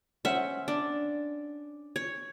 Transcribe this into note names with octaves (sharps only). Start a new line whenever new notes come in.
C#4 C5 E5 F#5
D4
C#5